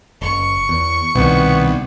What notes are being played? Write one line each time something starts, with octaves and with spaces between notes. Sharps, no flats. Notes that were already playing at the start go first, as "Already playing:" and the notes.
F#1 C#6
E2
C2 B2 D#3 B3